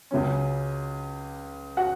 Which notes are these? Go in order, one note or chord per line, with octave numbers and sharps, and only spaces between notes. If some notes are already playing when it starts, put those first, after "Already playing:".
C#2 C#3 F#3 C#4
F#4 F#5